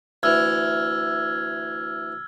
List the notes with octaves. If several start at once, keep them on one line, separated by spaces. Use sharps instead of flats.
D2 E3 E6 F6 G#6